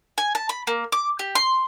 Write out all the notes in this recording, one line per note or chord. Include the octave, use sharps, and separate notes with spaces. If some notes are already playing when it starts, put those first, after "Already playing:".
G#5
A5
B5
A#3
D6
G4
C6